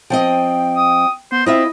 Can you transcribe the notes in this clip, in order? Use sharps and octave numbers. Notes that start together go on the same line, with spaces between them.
F3 C4 D#5 G5
D#6
B3 C5
C4 E4 F4 D#5 E5